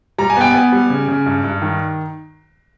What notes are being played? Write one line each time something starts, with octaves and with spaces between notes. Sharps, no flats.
G3 A#5
G#5
B3 G5
B3 G#5
G3
C#3
C#3
G2
G2
D#3